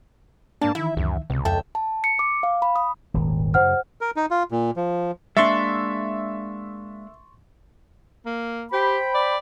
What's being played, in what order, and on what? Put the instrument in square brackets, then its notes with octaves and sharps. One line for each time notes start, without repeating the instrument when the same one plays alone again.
[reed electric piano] G#2 D4 [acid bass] A#3 [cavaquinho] A5
[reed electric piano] D#3 E3 [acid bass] E4 [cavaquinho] E5
[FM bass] C#2 [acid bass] F#2
[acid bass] C#2 [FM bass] C3
[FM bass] F2 [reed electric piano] A4 A5 [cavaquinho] E5 G5
[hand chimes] A5
C#7
D6
F5
B5
D#6
[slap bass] D#1 G#1
[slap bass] F#2 C#3 [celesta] C5 F#5 F6
[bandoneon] A#4
D#4
F4
A#2
F3
[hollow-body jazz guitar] G#3 A#3 D4 [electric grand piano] E5 [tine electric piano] C6 C#6 A6
[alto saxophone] A#3
[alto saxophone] G4 [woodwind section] C5 G5 B5
[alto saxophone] D5